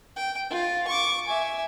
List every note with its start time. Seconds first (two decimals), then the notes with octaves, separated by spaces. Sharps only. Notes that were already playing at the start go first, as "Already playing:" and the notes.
0.16 G5
0.50 F4
0.87 C#6 D6
1.27 E5 G#5